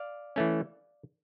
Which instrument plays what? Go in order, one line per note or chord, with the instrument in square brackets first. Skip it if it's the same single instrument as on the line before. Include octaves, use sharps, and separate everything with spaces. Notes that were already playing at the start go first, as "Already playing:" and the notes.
Already playing: [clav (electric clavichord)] D5 F5
E3 A3 C#4